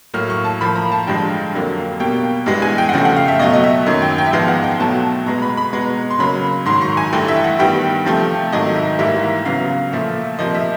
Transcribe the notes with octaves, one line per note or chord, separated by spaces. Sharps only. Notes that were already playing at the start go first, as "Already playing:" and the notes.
A2 F#3 A#3 F6
C#6
A5
A2 F3 A#3 B5
A#5
A5
G2 D3 F3 G#3 G5
F2 D3 F#3 A#3
B2 G3 A#3 G5
G2 E3 G#3 B3
G#5
G5
F#5
C#3 F3 A3 G5
F#5
F5
E5
B2 F#3 A3 D#5
D#5
E5
F#2 D#3 F#3 A#3
G5
G5
E5
G#2 F3 G#3 B3 F5
F#5
G5
B2 F#3 A3 A5
B2 G#3 B3 A#5
B5
B5
B2 G#3 B3 A#5
C6
C#3 F#3 A#3 B5
G#2 D#3 F#3 C6
C#6
G#5
G2 E3 A3 G5
E5
F#5
G2 D#3 G3 B3 G5
C3 F3 A3
G#2 D#3 F#3 A3 D#5
E5
G#2 E3 G3 A#3 E5
C#3 F#3 B3 F5
A#2 F3 A3 E5
C3 F3 A#3 D#5
E5